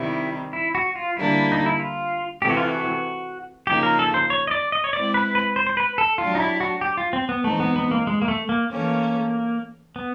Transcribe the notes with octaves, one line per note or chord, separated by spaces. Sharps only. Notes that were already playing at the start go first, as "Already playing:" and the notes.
Already playing: C3 D#3 G3 E4
E4
F#4
F4
D3 G3 A#3 D4 E4
D#4
E4
F4
C3 E3 A3 G4
F#4
F4
F#4
C#3 F3 A#3 D#4 G4
A#4
A4
C5
C#5
D#5
D5
D#5
C#5
G#3 C4 E4 D5
B4
B4
C5
C5
B4
A4
F#3 A3 D4 F4 G4
D#4
E4
F#4
G4
F4
C4
B3
E3 G#3 A3 C4 D#4
B3
B3
A#3
G#3
A#3
A3
A#3
E3 A3 A#3 C#4
B3